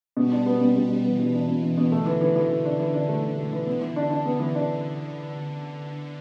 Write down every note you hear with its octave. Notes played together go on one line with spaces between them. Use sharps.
B2 G3
D4
B3
B2
B2
B2
E3 B3
B2
D4
B2
B2
B2
D3 A3
E3
E3
D3 E3
E3
D4
D3 E3
D4
A3
E3
A3
E3
D3 B3
E3
D4
D4
B3
E3
D4